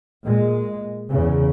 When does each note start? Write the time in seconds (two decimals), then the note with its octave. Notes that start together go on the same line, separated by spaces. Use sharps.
0.25 A#2 G#3
1.09 E2 C#3